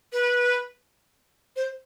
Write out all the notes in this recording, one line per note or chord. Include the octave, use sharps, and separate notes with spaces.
B4
C5